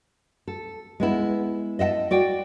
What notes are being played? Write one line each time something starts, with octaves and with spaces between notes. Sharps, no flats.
A4
G#3 B3 E4
D#5 E5 F#5 A5
F#4 D5 G5